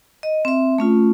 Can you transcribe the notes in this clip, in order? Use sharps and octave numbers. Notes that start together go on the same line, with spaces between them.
D#5
C4 E5
A3 C#4 F4